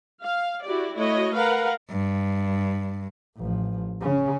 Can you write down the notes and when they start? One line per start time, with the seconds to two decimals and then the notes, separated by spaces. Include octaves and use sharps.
0.24 F5
0.65 E4 F#4 G4 D5
0.96 A3 E4 F#4 C#5 D#5
1.34 A#4 B4 F5 F#5
1.90 G2
3.37 A1 F3
4.01 C#3 C#4